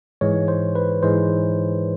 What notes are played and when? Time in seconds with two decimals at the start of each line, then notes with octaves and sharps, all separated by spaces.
0.21 G#2 E3 G#3 C#5
0.48 C5
0.75 B4
1.03 G#2 E3 G#3 C5